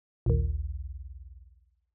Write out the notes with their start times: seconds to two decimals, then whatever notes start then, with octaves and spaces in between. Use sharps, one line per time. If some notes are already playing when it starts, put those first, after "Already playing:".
0.26 A#1 D#2